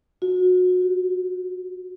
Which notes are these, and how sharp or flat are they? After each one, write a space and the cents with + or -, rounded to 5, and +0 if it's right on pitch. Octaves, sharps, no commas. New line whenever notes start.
F#4 -25
F#4 +45